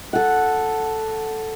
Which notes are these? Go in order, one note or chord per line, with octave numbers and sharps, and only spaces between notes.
A4 F#5